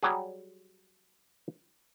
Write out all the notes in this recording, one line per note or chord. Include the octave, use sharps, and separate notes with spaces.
F#3 G3 F#4 G#4